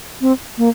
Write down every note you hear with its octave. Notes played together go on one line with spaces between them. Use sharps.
C4
A#3